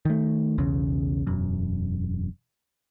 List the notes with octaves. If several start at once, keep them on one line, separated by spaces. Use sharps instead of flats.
D#3 A3
B1 E2 C#3
E1 F#2